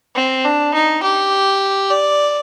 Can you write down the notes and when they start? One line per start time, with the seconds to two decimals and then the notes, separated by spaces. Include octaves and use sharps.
0.15 C4
0.45 D4
0.74 D#4
1.03 G4
1.91 D5